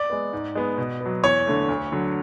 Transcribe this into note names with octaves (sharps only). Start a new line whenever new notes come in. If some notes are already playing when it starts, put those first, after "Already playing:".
Already playing: D5
G#3 B3
G#2
G#3 B3
B2
F#3 B3
E2 C#5
D3 A3
D2
D3 F#3